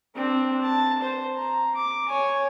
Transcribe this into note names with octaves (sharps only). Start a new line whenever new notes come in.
C4 D4
A5
C5
A#5
D6
C#5 G#5